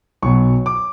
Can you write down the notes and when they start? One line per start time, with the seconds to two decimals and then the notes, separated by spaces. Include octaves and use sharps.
0.22 B1 B2 F#3 C#6
0.66 D6